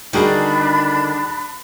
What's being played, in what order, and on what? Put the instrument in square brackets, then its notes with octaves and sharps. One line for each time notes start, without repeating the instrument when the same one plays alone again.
[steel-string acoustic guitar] D3 D#3 [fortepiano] G3 F#4 G#4 [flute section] D4 B5